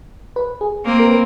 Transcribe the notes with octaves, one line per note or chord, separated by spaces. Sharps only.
B4
G#4
A#3 C4
A#4
B4